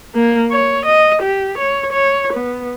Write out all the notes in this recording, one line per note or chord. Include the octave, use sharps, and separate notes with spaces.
A#3
C#5
D#5
G4
C#5
C#5
B3